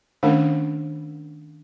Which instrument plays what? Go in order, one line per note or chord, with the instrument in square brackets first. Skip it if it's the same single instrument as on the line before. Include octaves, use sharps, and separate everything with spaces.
[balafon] D#3 A3 C#4 D4 A#4 F#5